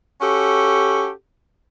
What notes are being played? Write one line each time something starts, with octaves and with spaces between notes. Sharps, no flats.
C#4 F#4 G4 A4